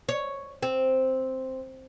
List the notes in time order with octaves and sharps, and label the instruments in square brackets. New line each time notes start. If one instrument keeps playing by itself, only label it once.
[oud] C#5
C4